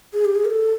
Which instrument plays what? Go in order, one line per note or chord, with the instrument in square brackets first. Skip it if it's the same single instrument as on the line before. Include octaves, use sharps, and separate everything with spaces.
[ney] G#4
G4
G#4
A#4
A4